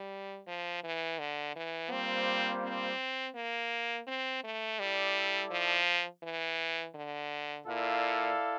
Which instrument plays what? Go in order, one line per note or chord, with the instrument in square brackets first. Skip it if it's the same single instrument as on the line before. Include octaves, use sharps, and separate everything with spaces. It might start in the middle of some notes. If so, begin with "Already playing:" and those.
Already playing: [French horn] G3
F3
E3
D3
E3
[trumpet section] G3 A#3 F4 C5 [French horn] C4
[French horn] C4
A#3
C4
A3
[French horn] G3 [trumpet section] E4 A4 D5
[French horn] F3
E3
D3
[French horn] A#2 [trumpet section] E4 A4 D5 F5